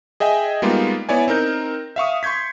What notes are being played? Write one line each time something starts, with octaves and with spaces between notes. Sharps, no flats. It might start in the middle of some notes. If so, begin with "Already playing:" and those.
G#4 D#5 E5 G5 G#5
G3 G#3 A#3 B3 D#4 F4
B3 E4 C#5 D5 G#5
C4 D#4 A#4 G6
E5 F5 C#6 D#6
C6 C#6 G6 G#6 B6